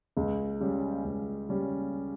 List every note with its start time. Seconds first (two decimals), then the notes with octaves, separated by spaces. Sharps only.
0.17 C#2
0.60 C#3 G3 C#4
1.04 C#2
1.49 C#3 G3 C#4